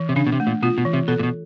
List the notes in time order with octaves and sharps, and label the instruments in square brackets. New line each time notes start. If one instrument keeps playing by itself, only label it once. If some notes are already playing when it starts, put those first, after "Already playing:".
Already playing: [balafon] E3
[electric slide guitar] C3
[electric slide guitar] C#3 [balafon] D4
[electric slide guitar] B2
C3
[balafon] A3
[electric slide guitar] A#2
[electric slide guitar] B2 [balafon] F4
[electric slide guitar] B2
[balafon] E3
[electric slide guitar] C3
[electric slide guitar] B2 [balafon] A4
[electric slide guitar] A#2
B2